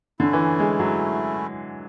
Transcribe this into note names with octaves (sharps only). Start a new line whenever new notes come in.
D3 A3 C#4 E4
E3
G#3
F#3